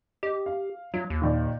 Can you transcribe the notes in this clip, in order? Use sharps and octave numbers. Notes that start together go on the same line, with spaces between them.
G4 D#5
F5
F#3 F4
D#2
A#2 D#3 D5